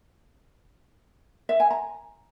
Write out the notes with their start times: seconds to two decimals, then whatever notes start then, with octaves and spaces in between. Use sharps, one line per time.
1.49 E5
1.60 G#5
1.71 A#5